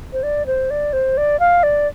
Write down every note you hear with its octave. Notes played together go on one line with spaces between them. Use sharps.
C5
D5
C5
D5
C5
D5
F5
D5